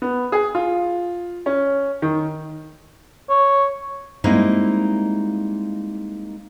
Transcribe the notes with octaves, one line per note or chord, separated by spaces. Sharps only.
B3
G#4
F4
C#4
D#3
C#5
G3 G#3 A#3 C4 D#4 E4